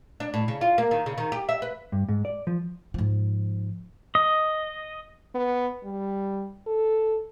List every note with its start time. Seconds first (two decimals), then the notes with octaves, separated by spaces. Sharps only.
0.20 D4
0.34 A2
0.48 C#3
0.61 F4
0.78 A#3
0.91 D#3
1.06 C#3
1.18 D#3
1.32 G4
1.49 E5
1.62 B4
1.92 G2
2.08 G#2
2.25 D5
2.47 F3
2.94 G#2 F3
4.15 D#5
5.35 B3
5.84 G3
6.67 A4